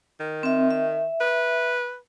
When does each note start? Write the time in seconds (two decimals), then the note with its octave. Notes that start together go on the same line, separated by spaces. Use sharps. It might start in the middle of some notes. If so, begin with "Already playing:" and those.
0.20 D#3
0.43 C4 E5
0.71 E5
1.21 B4